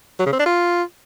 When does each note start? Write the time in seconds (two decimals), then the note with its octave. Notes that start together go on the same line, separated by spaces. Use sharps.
0.19 F#3
0.26 C#3
0.33 C4
0.39 D4
0.46 F4